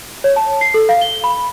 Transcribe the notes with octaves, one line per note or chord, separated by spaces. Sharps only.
C#5
A5
C7
A4
F5
G7
B5